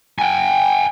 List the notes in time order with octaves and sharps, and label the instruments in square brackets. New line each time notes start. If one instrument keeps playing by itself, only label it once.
[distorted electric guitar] G5 G#5